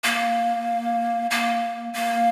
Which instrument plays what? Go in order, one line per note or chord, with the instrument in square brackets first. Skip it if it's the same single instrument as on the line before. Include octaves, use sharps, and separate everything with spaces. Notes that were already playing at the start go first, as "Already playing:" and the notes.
[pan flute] A#3
A#3
A#3